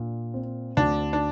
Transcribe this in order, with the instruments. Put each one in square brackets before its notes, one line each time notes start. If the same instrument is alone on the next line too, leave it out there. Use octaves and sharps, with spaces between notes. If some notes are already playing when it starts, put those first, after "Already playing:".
Already playing: [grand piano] A#2 D4
C4
[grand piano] D2 [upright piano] D4
[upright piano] D4